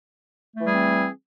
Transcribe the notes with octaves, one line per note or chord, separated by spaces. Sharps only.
E3 G3 A3 C4 G#4